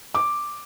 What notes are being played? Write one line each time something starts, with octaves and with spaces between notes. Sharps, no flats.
D6